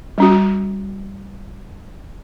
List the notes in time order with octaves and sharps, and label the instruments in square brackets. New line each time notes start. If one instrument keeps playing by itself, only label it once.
[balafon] G3 C#4 F#4